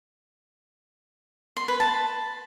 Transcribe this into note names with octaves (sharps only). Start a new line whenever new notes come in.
C6
B4
A5